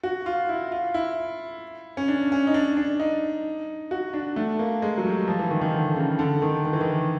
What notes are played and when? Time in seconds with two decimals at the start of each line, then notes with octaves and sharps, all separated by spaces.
0.03 F#4
0.26 F4
0.49 E4
0.72 F4
0.94 E4
1.97 C#4
2.08 D4
2.32 C#4
2.47 D#4
2.54 D4
2.77 D4
3.00 D#4
3.91 F#4
4.14 D4
4.36 A3
4.59 A#3
4.82 G#3
4.98 F#3
5.05 G3
5.28 F3
5.39 E3
5.51 D#3
5.61 D#3
5.74 D3
5.96 C#3
6.19 D3
6.42 D#3
6.65 D#3
6.73 E3
6.81 D#3